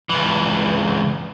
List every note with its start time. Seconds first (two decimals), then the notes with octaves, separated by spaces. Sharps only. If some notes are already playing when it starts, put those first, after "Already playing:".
0.09 C#2 E3